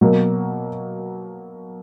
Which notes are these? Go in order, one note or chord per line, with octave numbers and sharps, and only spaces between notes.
B2 F#3 A#3